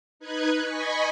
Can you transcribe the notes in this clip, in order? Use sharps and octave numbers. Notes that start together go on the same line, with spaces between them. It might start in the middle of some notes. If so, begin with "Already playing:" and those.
D#4 B4 F#6 G#6
D#5 G#5 B5 C#6